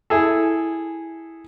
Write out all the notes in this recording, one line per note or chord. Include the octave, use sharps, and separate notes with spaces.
E4 G#4 A4